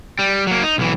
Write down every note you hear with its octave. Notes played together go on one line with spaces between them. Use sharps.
G3
F#3 A#3
D#4
B1 E3